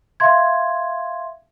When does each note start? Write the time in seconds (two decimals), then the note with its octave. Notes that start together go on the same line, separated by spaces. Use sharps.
0.20 E5 F5 C6 G#6